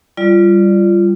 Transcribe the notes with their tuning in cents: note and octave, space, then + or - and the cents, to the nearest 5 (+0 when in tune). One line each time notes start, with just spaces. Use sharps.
G3 +0 F4 -20 D5 +10